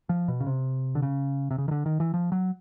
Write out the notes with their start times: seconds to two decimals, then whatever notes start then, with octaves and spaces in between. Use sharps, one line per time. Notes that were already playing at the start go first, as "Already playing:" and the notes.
0.09 F3
0.28 B2
0.40 C#3
0.46 C3
0.95 D3
1.02 C#3
1.51 C3
1.58 C#3
1.68 D#3
1.71 D3
1.86 D#3
2.00 E3
2.14 F3
2.32 F#3